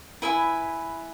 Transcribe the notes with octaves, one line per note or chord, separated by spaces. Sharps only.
E4 B4 E5 G#5